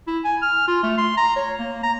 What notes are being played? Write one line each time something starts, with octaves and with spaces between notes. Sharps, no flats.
E4
G#5
F6
F4
A3
C6
A#5
C#5
A#3
A#5